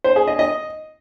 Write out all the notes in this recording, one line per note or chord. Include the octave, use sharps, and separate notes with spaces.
C5
G#4
D#5
D#5